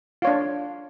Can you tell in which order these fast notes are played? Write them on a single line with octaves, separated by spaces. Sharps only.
F4 C#5 D4